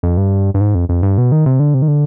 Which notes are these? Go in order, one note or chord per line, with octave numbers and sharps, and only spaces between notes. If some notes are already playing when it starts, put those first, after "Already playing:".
F2
G2
G2
G#2
F2
F2
G2
B2
D#3
C3
D3
C3
D#3
D3